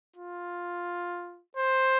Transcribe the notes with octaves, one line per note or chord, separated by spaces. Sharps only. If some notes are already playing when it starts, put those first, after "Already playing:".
F4
C5